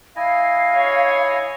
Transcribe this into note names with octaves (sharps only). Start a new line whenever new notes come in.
E4 D#5 F5 G#5
G#4 C#5